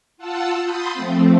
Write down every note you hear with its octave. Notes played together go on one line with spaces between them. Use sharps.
F4 F#5 A5 E6
B5 C6 D#6 G6 A6
F3 A3 C4